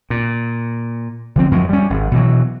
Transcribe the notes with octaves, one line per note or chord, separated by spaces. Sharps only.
A#2
D3 F3 C4
F#2 F3 F#3 G#3
G3 C#4
G#1
B2 E3 F#3